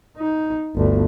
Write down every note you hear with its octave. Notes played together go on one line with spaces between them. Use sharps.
D#4
G1 D2